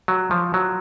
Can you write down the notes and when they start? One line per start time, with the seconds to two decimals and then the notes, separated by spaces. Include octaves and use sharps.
0.08 F#3
0.31 F3
0.54 F#3